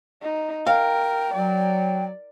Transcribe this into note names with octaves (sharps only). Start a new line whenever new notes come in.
D#4
A#4 F5 G5
F#3 D5